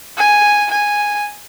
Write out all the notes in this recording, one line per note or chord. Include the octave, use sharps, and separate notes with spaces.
G#5
G#5